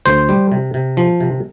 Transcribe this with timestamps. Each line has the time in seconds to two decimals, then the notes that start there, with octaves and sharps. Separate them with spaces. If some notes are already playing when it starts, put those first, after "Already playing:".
0.06 D2 C5
0.29 G3
0.52 C3
0.74 C3
0.97 F3
1.20 C3